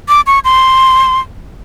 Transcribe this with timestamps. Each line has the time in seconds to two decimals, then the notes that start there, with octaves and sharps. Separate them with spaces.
0.08 D6
0.27 C#6
0.45 C6